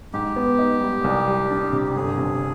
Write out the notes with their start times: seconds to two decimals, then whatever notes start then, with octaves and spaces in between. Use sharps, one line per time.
0.13 G#2 G4
0.36 B3
0.59 D#4
0.81 G3
1.04 C2
1.28 G3
1.50 D4
1.72 C3
1.87 G4
1.95 G1 G#4
2.18 C3